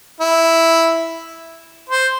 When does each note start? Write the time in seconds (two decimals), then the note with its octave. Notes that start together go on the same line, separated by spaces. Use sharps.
0.21 E4
1.89 C5